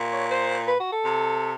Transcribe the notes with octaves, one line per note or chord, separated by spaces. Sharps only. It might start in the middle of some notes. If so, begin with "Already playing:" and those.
Already playing: A#2
C#5
C5
B4
F#4
A4
C3